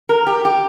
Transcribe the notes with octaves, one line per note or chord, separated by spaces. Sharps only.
A#4
G4
G4